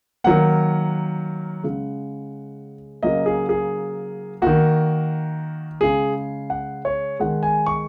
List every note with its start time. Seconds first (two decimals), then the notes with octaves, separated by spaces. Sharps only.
0.24 D#3 F#3 A#3 F#5
1.64 C#3 G#3
3.03 C#3 F#3 A#3 D#5
3.26 G#4
3.49 G#4
4.42 D#3 A#3 F#4
5.81 C#3 G#3 G#4
6.50 F#5
6.85 C#5
7.19 D#3 G#3 F#5
7.43 G#5
7.66 C#6